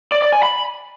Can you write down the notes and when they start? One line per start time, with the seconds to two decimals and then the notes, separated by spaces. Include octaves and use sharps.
0.12 D5
0.22 D5
0.33 G#5
0.43 B5